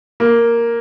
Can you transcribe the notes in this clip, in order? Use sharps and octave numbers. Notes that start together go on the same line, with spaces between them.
A#3